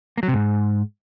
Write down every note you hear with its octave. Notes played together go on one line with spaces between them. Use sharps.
A#3
F#3
C3
G#2